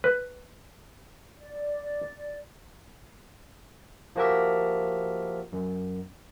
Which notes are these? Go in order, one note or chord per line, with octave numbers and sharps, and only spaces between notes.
B4
D5
F3 A#3 F#4 G4 A#4 E5
F#2